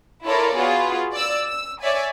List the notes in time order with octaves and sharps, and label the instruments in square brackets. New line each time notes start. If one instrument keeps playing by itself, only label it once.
[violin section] E4 F4 A4 A#4 C#5 D5
B3 F4 F#4 G#4
D5 E6
E6
C#5 D5 E5 G#5